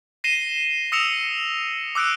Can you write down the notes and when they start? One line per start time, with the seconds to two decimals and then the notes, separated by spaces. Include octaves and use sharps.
0.24 A#6 C7 D#7 E7 G7
0.92 D#6 E6 A#6 C#7 E7 F7
1.95 D6 E6 F#6 C#7 D7